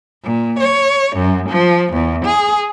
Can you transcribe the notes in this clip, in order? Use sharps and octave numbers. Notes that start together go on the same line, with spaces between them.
A#2
C#5
F#2
F3
E2
G#4